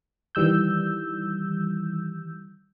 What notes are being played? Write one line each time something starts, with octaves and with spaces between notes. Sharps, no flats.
D#3 E3 G3 E6 G6